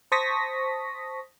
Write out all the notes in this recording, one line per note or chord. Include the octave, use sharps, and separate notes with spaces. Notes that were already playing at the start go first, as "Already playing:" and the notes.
C5 A5 C#6 D#6 A#6 B6